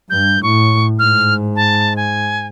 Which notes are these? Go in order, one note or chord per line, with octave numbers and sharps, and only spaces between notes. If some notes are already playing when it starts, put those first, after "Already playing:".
G2 G6
A2 C#6
G#2 F6
A5
G#5